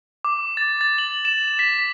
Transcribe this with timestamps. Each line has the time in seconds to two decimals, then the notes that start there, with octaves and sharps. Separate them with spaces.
0.25 D6
0.57 A6
0.81 A6
0.98 F#7
1.25 E7
1.59 B6